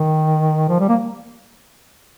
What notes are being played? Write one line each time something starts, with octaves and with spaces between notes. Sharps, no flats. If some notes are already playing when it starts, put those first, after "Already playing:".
Already playing: D#3
F3
G3
A#3